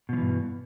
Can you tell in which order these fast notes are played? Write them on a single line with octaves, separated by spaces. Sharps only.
B2 F3 E3 G2